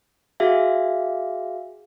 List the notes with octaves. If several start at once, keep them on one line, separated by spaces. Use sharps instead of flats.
F#4 G#4 E5 F5